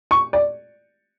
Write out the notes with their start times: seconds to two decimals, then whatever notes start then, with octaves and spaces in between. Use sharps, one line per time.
0.11 C#6
0.33 D5